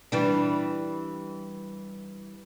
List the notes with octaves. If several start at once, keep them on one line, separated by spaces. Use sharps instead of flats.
E3 G3 D4